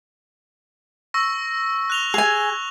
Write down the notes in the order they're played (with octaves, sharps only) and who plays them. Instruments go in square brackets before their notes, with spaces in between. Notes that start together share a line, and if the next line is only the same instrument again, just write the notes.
[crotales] C#6 E6 A#6
F#6 F7 G7
[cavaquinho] G#4 G#5 [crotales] F7